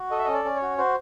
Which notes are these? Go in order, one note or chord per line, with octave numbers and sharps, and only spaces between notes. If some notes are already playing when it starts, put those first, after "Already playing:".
Already playing: F#4
A4 D#5
E5
C#4 D#5
D5
C#4
C#5
F#4
F#4 C5